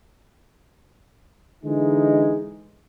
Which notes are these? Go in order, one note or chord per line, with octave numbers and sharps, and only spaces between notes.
D3 E3 G#3 D#4